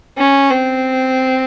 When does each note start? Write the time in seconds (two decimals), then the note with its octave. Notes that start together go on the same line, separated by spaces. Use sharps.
0.18 C#4
0.50 C4